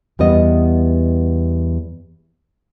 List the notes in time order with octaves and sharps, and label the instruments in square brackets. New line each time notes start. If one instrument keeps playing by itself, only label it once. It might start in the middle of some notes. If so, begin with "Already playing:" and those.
[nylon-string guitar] E2 G3 B3 D#5